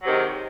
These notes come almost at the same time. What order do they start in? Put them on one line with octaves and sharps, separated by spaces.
F#3 C3 D#3 G#3